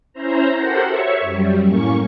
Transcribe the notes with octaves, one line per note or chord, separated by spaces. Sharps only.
C#4 E4 C5 A#5
F#4 G4 A4 A#4 C5 F#5
C#5 E5 C#6
F#2 G3
A2 A#3 C#4 C#6